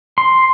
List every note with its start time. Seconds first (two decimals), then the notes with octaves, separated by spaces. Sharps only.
0.18 C6